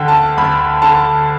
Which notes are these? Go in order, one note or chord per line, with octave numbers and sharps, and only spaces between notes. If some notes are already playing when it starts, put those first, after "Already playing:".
Already playing: D2 D3 G5
A5
D2 B5
D3 A5